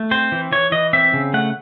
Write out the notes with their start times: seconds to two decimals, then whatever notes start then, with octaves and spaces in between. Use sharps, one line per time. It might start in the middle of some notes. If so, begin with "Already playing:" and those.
Already playing: A3
0.11 C4 C5
0.32 E3
0.52 E3 C#5
0.72 E3 D#5
0.93 C4 E5
1.13 C#3
1.34 A3 F#5